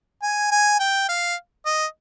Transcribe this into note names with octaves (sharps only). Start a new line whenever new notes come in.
G#5
G#5
G5
F5
D#5